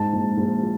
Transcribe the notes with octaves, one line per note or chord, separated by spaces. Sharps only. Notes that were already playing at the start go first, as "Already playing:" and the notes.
Already playing: G#2 A5
A#1
A#1
F3